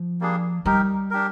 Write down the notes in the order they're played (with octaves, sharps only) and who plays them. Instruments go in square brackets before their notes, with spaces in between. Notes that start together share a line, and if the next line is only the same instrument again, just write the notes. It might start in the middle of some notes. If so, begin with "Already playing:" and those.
Already playing: [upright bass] F3
[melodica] G3 A#3 D4 G#4
[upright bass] G3 [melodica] D#4 G4 A#4
[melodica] D4 G4 A#4